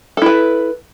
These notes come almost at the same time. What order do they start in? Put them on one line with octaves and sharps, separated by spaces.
A4 E4 B4